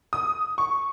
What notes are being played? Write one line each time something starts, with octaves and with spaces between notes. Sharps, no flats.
D#6
C#6